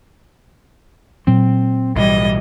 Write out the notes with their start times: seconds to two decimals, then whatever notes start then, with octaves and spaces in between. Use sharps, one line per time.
1.27 A#2 F#3 C4
1.95 B1 A2 E3 G3 D#5